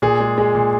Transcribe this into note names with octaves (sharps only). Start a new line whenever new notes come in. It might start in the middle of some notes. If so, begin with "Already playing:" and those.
A#2 G#4
G#3
G#3
A#2